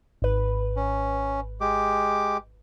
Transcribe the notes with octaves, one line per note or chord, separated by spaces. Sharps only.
G#1 B4
C#4
G#3 G4 D6